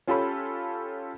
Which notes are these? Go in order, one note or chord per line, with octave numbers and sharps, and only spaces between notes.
C#4 F4 G4 A4 C#5 B5